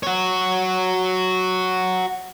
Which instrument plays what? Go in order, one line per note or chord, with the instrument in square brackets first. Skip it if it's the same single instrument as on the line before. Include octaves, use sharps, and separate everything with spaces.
[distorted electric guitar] F#4 C#5